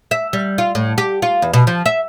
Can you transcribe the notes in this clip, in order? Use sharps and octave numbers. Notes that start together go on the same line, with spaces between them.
E5
G3
F4
A2
G4
F4
E2
B2
F3
E5